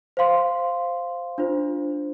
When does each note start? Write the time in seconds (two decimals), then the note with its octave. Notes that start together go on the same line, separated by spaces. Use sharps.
0.17 C5 F5 C6
1.38 D4 F4 C5